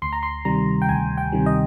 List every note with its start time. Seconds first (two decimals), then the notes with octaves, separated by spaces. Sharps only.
0.02 D2 C6
0.13 A#5
0.23 C6
0.45 C3 D#3 G3 A#5
0.82 G5
0.88 D2 G#5
1.18 G5
1.32 C3 D#3 G3
1.46 D#5